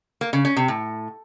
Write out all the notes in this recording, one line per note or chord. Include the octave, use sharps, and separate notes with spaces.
A#3
C#3
C#4
C3
A2